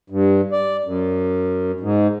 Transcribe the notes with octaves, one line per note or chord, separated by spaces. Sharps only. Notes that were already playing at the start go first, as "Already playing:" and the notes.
G2
D5
F#2
G#2